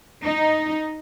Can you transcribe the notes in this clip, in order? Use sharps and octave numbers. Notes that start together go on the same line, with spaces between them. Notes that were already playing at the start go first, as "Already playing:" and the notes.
D#4